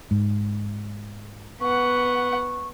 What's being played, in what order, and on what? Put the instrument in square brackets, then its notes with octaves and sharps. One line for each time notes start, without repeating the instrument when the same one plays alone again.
[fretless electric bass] G#2
[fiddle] B3 F#5 [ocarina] C#6